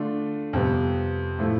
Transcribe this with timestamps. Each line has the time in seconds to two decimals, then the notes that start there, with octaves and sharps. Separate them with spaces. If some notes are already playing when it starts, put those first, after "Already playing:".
Already playing: D3 A3 D4 F4
0.53 F2 C3 G3 B3
1.38 A2 F3 A3 E4